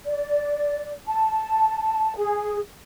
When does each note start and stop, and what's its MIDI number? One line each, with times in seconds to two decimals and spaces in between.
0.05 0.91 74
1.06 2.16 81
2.17 2.58 68